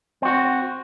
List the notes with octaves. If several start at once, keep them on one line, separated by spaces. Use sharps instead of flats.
C4 F#4